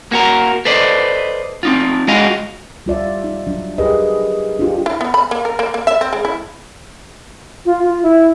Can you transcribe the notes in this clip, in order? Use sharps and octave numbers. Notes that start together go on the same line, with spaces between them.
A#3 F#4 A#4
A4 B4 C5 D5 D#5
C4 D#4 F4
G#3 F4 F#4 G#4 D#5 F5
G3 F4 D5 E5
D#4
F#3 D4
G4 G#4 A#4 B4 D#5
D4 F4 G4
E4
B3
B5
A#3
A#4
A#3
A#3
E5
C4
G#3
E4
F4
F4
E4